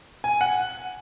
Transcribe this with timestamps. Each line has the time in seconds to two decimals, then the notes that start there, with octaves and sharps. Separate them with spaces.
0.24 G#5
0.41 F#5